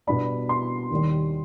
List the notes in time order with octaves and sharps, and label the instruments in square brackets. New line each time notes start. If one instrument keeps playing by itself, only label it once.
[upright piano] B2 G3 B3 D4 B5
C6
D#2 D#3 G3